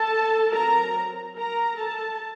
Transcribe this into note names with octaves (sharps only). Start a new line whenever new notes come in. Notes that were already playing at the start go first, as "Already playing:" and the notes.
Already playing: A4 A5
F#3 C4 A#4 A#5
A#4 A#5
A4 A5